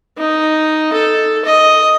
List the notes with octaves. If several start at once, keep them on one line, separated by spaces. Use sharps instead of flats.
D#4
A4
D#5